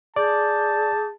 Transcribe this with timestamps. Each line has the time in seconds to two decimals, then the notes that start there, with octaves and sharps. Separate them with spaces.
0.16 G#4 D5 A5 D6 G6